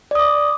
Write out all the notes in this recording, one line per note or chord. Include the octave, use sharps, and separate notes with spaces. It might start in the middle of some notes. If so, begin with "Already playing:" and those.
D5 D6 D#6